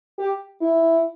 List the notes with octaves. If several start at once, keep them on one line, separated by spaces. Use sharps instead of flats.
G4
E4